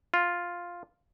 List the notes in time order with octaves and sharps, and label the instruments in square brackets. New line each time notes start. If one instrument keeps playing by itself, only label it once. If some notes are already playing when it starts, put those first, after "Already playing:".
[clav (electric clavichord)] F4